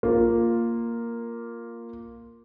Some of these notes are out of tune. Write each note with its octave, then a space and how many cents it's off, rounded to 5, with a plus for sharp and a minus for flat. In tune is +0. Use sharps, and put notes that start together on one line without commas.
A#3 +0 F4 +0